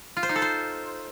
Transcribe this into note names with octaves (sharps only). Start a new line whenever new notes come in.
F4
C5
D#4
A4
C5